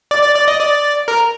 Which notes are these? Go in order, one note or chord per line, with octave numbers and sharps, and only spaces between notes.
D5
D5
D5
D#5
D5
A#4